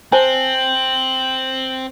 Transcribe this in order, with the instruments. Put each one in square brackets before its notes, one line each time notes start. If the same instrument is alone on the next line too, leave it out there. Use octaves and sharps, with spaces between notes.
[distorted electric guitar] C4 [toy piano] C5 G#5 A5 [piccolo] F#7